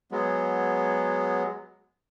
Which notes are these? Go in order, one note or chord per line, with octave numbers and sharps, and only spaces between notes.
F#3 G#3 B3